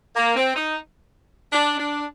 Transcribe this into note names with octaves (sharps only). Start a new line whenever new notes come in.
A#3
C4
D#4
D4
D4